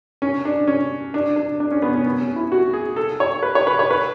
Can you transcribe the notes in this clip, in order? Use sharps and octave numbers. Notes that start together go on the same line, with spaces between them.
C#4
D4
C#4
D4
D4
D4
C#4
B3
C#4
B3
C#4
E4
F#4
G#4
A4
C#5
B4
C#5
B4
C#5
B4